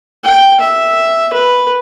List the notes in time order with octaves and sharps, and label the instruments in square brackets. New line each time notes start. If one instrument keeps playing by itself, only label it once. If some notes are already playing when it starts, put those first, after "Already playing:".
[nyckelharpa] G5
E5
B4